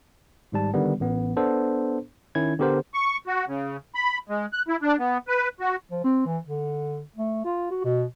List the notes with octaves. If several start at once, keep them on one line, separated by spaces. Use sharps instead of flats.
G#1 G#2 G3 A5
D3 D#3 G3 B3
A1 B3
B3 D4 A4 C5
D#3 C#4 E4 G#6
D3 B3 G4 A#4 C5
C#6
F#4
C#3
B5
G#3
F#6
E4
D4
B3
B4
F#4
F3
C4
E3
D3
A3
F4
F#4
B2